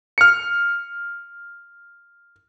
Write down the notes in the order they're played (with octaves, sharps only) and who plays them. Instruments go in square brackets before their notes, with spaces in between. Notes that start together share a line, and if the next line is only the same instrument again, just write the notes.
[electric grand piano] F6 C#7